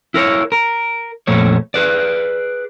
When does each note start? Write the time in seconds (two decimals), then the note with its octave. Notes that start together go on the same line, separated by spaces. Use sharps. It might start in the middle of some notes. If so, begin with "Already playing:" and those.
0.14 E4 A#4 B4 C#5
0.52 A#4
1.27 F2 A#2 A3 C#5
1.74 G#4 B4 D5